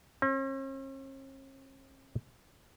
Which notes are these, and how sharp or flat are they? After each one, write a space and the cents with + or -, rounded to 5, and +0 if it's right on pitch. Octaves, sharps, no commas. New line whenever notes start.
C#4 -45